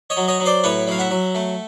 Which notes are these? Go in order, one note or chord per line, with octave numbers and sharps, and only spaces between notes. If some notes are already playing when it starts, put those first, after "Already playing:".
C#5 D#5
F#3
C#5 D#5
F#3
C5 D5
A2 B4 C#5
F#3 F5
E5 F#5
F#3
A3